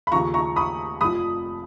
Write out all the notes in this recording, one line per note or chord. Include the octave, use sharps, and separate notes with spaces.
B5
D#2 C#3 F3 A#5 C#6
A#5 C#6
B5 D#6
F1 F2 F3 B5 D#6